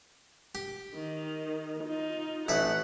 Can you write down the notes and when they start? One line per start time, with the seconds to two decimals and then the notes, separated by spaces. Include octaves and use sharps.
0.55 G4
0.94 D#3
1.84 D#4 F4
2.48 A1 A2 E5 F#5